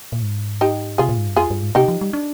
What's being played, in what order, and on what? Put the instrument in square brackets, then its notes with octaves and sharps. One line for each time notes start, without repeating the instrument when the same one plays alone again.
[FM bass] A#2
G#2
[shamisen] D#4 G4
[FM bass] C3 [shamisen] F4 G#4
[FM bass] A#2
G#2
G2
[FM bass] F2 [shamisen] F4 G#4
[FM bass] G2
G#2
[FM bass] C3 [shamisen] D#4 G4
[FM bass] F3
G3
D4